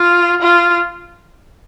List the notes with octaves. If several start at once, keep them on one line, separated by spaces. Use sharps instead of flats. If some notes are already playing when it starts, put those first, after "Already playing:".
Already playing: F4
F4